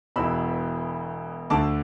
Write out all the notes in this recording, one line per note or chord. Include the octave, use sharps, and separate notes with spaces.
E1 E2 B2 B5 E6
D2 D3 A5 D6